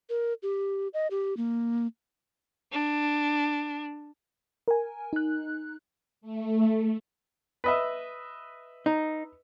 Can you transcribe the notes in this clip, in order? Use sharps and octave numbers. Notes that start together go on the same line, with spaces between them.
A#4
G4
D#5
G4
A#3
D4
A#4 G#5
D#4 F#6
A3
B4 D#5 E5
D#4